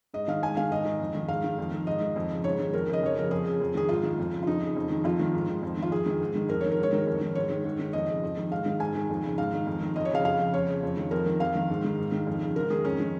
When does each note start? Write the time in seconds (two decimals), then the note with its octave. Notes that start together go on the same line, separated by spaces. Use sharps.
0.14 G#2 D#5
0.28 D#3 F5
0.42 G#2 G#5
0.57 D#3 F5
0.71 G#2 D#5
0.86 D#3
1.00 F2
1.15 D#3
1.28 G#2 F5
1.44 D#3
1.59 F2
1.72 D#3
1.87 G#2 D#5
2.01 D#3
2.16 F2
2.31 C#3
2.44 G#2 C#5
2.60 D#3
2.73 F2 A#4
2.88 C#3 D#5
3.03 F2 C#5
3.17 C#3 A#4
3.31 F2 G#4
3.46 C#3
3.61 F2
3.75 D#3 G#4
3.89 G#2 F4
4.03 D#3
4.19 F2
4.33 C#3
4.42 F4
4.47 F2 D#4
4.62 C#3
4.76 F2
4.90 D#3
5.04 F2 F4
5.19 D#3
5.33 G#2
5.48 D#3
5.62 F2
5.77 D#3
5.82 F4
5.91 F2 G#4
6.06 D#3
6.21 G#2
6.35 D#3
6.49 F2 A#4
6.61 D#3 C#5
6.72 A#4
6.79 G#2 C#5
6.93 D#3 A#4
7.07 F2
7.21 D#3
7.35 G#2 C#5
7.50 D#3
7.64 G#2
7.79 D#3
7.93 F2 D#5
8.08 C#3
8.23 F2
8.37 D#3
8.51 G#2 F5
8.66 D#3
8.80 G#2 G#5
8.95 D#3
9.10 F2
9.24 C#3
9.38 G#2 F5
9.53 D#3
9.67 F2
9.81 D#3
9.96 F2 D#5
10.05 C#5
10.11 C#3 F5
10.24 F2 F5
10.39 C#3
10.54 F2 C#5
10.68 C#3
10.83 F2
10.97 D#3
11.11 F2 A#4
11.26 D#3
11.40 F2 F5
11.55 D#3
11.70 G#2
11.84 D#3
11.98 G#2
12.12 D#3
12.27 F2
12.42 C#3
12.56 G#2 A#4
12.70 D#3 G#4
12.85 F2 C#4
13.00 D#3